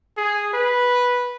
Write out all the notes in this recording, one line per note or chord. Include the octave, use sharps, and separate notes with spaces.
G#4
B4